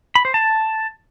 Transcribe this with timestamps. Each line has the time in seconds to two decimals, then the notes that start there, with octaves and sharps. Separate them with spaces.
0.15 B5
0.25 C5
0.34 A5